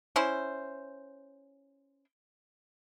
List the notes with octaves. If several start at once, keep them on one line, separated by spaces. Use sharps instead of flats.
C#4 E4 C5